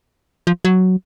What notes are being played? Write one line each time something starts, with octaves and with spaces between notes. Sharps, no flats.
F3
F#3